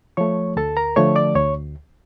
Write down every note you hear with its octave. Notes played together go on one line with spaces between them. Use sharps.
F3 A3 C#5 C#6
D2 A4 A5
A#4 A#5
D3 F3 A3 C#5 C#6
D5 D6
D2 C#5 C#6